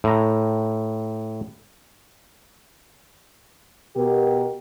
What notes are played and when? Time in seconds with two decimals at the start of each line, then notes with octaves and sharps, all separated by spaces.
0.04 A2 A#5
3.96 B2 G4 A#4